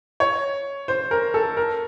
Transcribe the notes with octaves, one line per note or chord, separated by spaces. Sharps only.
C#5
C5
A#4
A4
A#4